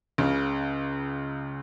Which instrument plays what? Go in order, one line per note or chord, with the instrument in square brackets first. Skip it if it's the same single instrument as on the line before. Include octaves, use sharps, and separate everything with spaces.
[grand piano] C#2 C#3